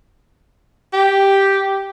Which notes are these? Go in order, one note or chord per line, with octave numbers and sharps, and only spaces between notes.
G4